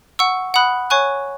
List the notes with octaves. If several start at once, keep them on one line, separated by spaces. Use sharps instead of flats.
F#5 C#6 E6
F#5 B5 D#6 F#6
C#5 G#5 C#6 F#6